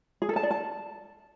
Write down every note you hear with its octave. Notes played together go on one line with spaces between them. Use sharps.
G#4
A4
A5
D5
A5